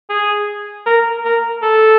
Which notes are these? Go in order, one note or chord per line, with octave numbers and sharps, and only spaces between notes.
G#4
A#4
A#4
A4